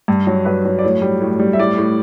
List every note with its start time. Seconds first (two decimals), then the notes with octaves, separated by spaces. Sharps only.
0.08 G2
0.27 F#3
0.45 G2 B4
0.65 F#3
0.79 D5
0.84 A2 C#5
1.02 G3
1.21 A2
1.39 G3
1.53 E5
1.58 A2 D5
1.78 A2